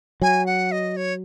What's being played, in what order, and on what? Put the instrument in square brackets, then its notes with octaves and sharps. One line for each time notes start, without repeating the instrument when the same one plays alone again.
[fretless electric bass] F#3 [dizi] G#5
[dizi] F#5
D#5
C#5